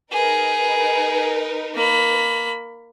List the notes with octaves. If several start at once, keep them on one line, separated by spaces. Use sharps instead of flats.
D#4 G#4 A#4 B4
A#3 B5